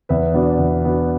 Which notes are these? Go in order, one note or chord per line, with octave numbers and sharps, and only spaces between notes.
E2 B4 E5
B2 B3 D4
E2
B2 B3 D4